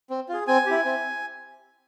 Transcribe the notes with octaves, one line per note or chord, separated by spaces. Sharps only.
C4
F4 G#4
C4 G#5
E4 G4
C4